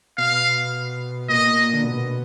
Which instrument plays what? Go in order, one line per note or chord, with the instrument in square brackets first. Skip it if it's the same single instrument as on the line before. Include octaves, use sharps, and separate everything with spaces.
[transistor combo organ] B2 [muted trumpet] F5
[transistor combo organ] A#2 [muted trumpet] D#5
[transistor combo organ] D3
B2